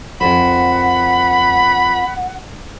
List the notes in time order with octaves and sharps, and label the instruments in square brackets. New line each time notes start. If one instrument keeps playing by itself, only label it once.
[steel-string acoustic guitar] F2 A#4 C5 [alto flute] F#5 [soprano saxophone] B5